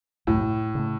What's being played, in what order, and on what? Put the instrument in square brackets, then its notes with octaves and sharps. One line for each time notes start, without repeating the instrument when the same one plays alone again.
[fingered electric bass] C2 F#2 [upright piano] A2
[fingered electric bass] A3
C#3 A3